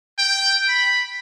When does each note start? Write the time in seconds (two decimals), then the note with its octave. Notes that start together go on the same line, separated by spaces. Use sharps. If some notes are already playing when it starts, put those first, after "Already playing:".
0.19 G5
0.69 B5